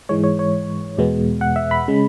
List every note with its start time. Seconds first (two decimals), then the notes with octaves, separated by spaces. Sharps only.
0.09 G#2 E3 G#3 C#5
0.24 C#5
0.39 C#5
0.97 E2 B2 G#3 B3
1.41 F#5
1.56 E5
1.71 B5
1.88 C#3 G#3